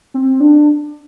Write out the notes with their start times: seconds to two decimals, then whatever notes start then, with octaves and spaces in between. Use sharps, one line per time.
0.14 C4
0.40 D4